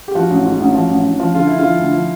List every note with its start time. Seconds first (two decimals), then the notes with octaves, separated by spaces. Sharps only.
0.08 G4
0.15 F3 F#4
0.30 A1
0.45 G#2
0.60 A1
0.75 F3
0.89 A1
1.05 A1
1.20 F3
1.34 D3 F4
1.47 D3 E4
1.59 F4
1.64 F3
1.79 D2
1.94 F3